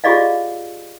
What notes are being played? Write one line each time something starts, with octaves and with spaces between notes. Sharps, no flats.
F4 G4 G#4 D5 D#5 F5